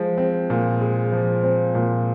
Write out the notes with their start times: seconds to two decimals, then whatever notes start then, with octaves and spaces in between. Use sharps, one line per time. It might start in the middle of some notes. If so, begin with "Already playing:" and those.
Already playing: F3 G#3
0.18 C4
0.50 A#2
0.81 G#3
1.12 F3
1.43 C4
1.75 A#2